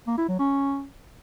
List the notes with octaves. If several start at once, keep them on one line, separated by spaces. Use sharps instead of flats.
A#3
E4
F#3
C#4